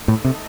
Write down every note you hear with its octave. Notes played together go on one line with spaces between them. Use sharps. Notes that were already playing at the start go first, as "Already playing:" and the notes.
Already playing: A3 D#4 A4 D#5
A2
C3